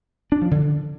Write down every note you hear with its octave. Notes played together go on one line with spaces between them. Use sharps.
D4
F3
D3